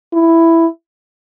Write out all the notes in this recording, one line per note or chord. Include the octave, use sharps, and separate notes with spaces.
E4